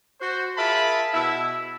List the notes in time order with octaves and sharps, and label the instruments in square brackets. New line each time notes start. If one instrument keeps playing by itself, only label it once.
[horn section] F#4 C5
F4 G#4 A#4 E5 A5 B5
B2 E4 E5